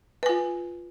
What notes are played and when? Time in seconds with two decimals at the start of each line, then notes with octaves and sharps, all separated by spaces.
0.23 B4
0.26 G#5
0.29 F4